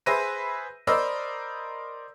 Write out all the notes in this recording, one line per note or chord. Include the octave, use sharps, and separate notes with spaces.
G#4 B4 C5 E5 A#6 D#7
A#4 C5 D5 D#5 B5 E6